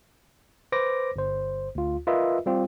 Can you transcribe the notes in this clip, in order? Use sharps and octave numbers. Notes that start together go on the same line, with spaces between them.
B4 C5 D6 A#6
G1 C5
D2 F4
F4 A#4 B4 D#5 E5
G3 C4 F4 G4